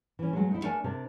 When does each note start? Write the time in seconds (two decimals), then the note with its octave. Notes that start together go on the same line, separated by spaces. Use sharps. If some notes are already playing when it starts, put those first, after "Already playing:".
0.19 E3 C#4
0.33 F#3 G#3 A3
0.51 D#4 E4
0.63 A3 D4 A#4 D5 G#5
0.84 C3 D4 A#4